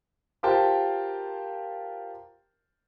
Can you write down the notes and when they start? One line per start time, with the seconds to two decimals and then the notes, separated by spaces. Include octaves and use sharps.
0.43 F4 G4 A#4 C5 G5 A5